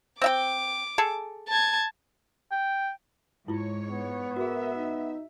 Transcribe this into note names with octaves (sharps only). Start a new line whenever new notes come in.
C4 E5 G5 D6
G#4 A4
A5 G#6
G5
G#2 E4 F4 C#5
B3
F#4 G#4 A#4 E5
D#4